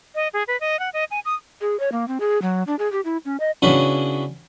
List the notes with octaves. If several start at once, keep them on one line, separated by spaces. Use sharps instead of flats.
D#5
G#4
B4
D#5
F#5
D#5
G#5
D#6
G#4
C#5
A#3
C4
G#4
F#3
D4
G#4
G4
E4
C#4
D#5
C#3 B3 C#4 D4 E4 F#4